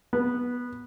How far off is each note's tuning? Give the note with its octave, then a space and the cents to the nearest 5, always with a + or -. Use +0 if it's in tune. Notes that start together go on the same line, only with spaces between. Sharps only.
B3 -10